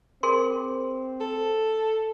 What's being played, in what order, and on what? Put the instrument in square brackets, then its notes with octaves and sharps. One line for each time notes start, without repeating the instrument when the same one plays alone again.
[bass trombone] C4 [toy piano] G#4 A#4 C6
[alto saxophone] A4